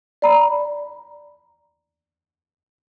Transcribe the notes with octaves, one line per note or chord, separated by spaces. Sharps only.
D5 A#5 B5